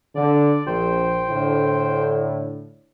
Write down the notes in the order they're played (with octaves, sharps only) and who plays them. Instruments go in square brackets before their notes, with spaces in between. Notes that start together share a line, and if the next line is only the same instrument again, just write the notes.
[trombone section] D3 [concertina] D5
[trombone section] A#1 [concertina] C5 G5
[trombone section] A2 D3